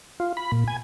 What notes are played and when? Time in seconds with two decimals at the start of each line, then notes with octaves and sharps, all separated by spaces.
0.20 F4
0.37 B5
0.52 A#2
0.68 G#5